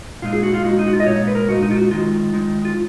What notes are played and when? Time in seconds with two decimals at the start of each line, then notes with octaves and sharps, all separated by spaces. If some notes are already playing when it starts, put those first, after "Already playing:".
0.22 A#2 G#3 D#4 F4
0.33 G#4
0.43 F#4
0.54 F4
0.64 A#2 G#3 D#4 F#4
0.79 D#4
0.88 F#4
0.93 F4
1.00 D#5
1.06 A#2 G#3 D#4 C#5
1.28 B4
1.35 A#4
1.49 A#2 G#3 D#4 F#4
1.63 D#4
1.71 F4
1.77 F#4
1.91 D#3 G#3 D#4 F4
2.33 D#3 G#3 D#4
2.65 F4